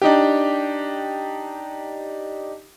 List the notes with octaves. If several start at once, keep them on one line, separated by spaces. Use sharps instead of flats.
D4 D#4 G4